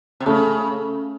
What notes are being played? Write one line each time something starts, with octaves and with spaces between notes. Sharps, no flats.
C3
C#3 A3